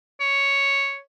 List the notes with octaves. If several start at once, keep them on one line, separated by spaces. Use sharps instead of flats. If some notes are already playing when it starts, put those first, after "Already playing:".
C#5